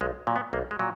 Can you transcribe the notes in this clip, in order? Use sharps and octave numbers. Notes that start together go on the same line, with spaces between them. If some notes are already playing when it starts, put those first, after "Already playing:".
B1 G#3
A#2 F#3
B3
B1 A#3
G#3
A#2 F#3